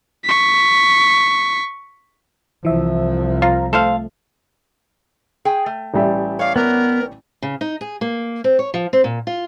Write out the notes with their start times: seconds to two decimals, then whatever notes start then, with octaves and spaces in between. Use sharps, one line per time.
0.24 C#6 B6
2.65 C2 E3 F3 E5
3.42 F4 F5 A#5
3.73 A3 A4 C5 F5
5.45 G#4 G5 G#5
5.66 A3
5.94 A1 G3 E5
6.39 C#5 D5 F5
6.56 B3 A#4
7.42 C#3
7.61 D#4
7.81 G#4
8.01 A#3
8.44 C4
8.59 C#5
8.74 F3
8.93 C4
9.04 A#2
9.27 F4